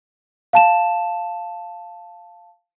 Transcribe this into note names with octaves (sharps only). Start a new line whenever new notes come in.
F5 A5 E7